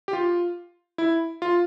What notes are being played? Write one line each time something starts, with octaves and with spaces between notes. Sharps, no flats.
G4
F4
E4
F4